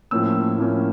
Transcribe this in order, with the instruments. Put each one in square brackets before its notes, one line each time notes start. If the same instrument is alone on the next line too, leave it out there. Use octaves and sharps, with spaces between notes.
[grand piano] A2 F3 A#3 C#4 E6
A2 F3 A#3 C#4